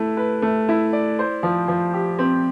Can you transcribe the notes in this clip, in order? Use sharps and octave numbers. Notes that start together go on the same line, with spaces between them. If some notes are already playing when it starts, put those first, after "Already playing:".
Already playing: A3 E4
B4
A3
E4
D5
C5
F3
F3
G4
C4